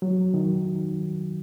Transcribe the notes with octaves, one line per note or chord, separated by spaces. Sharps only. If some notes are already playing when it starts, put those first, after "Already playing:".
F#3
D#3